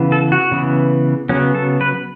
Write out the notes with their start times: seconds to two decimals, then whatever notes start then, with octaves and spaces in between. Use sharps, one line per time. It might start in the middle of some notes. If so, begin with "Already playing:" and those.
Already playing: C#3 E3 B3
0.12 A4
0.32 F#4
0.51 C#3 E3 B3
1.29 C#3 F#3 B3 C#4
1.55 A4
1.81 B4